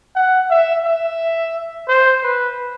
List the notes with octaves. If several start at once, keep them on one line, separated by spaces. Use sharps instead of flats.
F#5
E5
E5
C5
B4